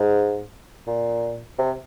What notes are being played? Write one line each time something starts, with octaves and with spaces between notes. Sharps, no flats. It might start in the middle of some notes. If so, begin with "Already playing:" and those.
Already playing: G#2
A#2
C3